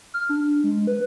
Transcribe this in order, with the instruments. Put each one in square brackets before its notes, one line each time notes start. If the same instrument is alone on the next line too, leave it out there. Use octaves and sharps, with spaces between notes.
[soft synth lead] F6
D4
G#3
B4